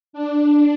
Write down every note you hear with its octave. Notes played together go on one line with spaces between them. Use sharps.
D4